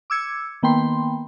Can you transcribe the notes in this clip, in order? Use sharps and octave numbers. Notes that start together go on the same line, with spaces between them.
D6 E6 G#6 C#7
D#3 A#3 B3 G5 B5 C6